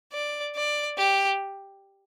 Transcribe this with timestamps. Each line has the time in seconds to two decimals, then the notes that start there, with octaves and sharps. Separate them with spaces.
0.13 D5
0.56 D5
0.98 G4